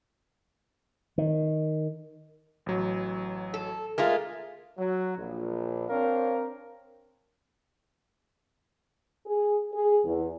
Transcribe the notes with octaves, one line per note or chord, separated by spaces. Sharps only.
D#3
A1 F#3
A4
G#3 A3 F4 A#4
F#3
A#1
C4 D4 A#4 C5 C#5 F5
G#4
G#4
E2